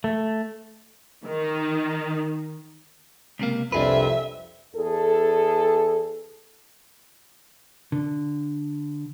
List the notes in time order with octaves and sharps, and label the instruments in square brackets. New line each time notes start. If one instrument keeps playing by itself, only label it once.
[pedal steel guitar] A3
[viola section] D#3
[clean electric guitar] C#2 C3 A#3
[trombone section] C2 F2 [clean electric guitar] D4 G#4 B4 [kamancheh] E5
[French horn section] E2 G#4 A4
[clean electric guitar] D3